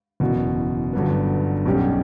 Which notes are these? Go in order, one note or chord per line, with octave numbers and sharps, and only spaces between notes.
F#1 E2 B2
G1 G2 F#3 B3
B1 B2 G3 C#4 G4